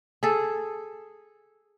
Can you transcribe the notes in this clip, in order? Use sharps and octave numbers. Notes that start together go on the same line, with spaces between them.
G#4 A4